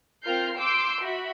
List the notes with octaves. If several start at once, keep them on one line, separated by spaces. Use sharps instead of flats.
C4 F4 A#4 F6 G6 C7
C6 D6 E6 G6 C7 D7
F#4 E5 B5